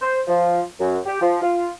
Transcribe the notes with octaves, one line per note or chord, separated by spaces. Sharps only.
C5
F3
F#2
G4
F3
F4